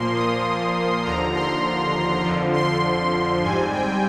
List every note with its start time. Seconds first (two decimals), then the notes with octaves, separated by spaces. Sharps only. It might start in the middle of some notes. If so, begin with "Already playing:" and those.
Already playing: A#2 F3 A#3 C6
0.15 D#6
1.04 D#2 D3 F3 A#5
1.33 C6
2.23 F2 D3 F3
2.53 C6
3.42 G#2 G3 C4 G#5
3.72 G5